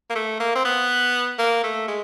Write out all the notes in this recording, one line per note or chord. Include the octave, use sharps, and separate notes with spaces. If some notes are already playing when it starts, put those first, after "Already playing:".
A#3
A3
A#3
C4
B3
A#3
A3
G#3